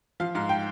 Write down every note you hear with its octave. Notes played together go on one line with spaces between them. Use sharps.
F3 F5
G#2 F5
G5